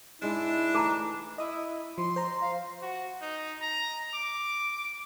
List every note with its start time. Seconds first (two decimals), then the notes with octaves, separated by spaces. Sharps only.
0.22 G#2 G#3 D4 E4
0.75 E3 A3 G#4 A5 A#5
1.38 E4 D#5 D#6
1.98 F3 C6
2.16 C5 A#5
2.41 F5
2.82 F#4
3.21 D#4
3.61 A#5
4.14 D6